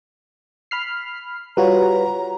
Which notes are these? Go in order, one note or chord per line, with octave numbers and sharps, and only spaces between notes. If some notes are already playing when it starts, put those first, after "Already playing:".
B5 F6 C7
G3 F4 F#4 B4 C#5 A#5